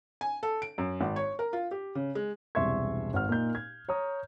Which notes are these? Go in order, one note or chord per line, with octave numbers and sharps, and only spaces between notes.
G#5
A4
D7
F#2
G#1
C#5
A#4
F4
G4
C#3
G#3
E1 C2 E5 C6 C#6 G#6
G#1 F#5 F6
A#2 D#4 G6
G#6
C#5 A#5 D#6